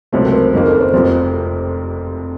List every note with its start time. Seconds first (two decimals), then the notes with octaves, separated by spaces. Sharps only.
0.12 C#2 C3 F#3 A3 C4 C#5
0.25 A#4
0.33 C5
0.53 F#1 F2 D#3 A#3 A#4
0.66 A4
0.80 C5
0.93 F1 F2 C3 F3 C5